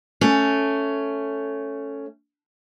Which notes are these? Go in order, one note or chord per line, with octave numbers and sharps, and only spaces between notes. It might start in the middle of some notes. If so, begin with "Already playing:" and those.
A3 C#4